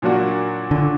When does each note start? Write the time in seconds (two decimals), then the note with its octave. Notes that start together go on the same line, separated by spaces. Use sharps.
0.02 A#2 F#3 A#3 D4 F#4
0.71 D3